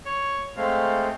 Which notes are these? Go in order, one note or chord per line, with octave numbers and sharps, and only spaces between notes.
C#5
G#3 A3 C4 F5